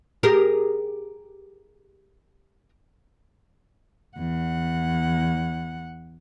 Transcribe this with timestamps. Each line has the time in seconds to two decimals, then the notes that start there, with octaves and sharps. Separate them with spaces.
0.23 G4 G#4 A#4
4.18 E2 F#5